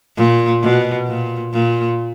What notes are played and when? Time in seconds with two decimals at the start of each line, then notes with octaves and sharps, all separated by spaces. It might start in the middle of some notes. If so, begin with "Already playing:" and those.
0.17 A#2
0.62 B2
1.07 A#2
1.53 A#2